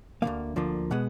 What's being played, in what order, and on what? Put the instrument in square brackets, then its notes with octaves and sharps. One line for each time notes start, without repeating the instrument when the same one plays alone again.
[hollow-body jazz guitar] D2 D3 F3 A#3 F5
D2 D3 F3 A#3
B2 G#3 B3 F#5